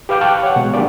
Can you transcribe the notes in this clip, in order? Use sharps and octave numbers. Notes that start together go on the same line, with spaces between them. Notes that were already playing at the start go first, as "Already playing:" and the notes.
G4 B4 F5 D6 G6
F5 G5 A5 C#6 F6 F#6
C#5 F#5
B2 G#3
F#3 G#3 A#3 D4 G4 D5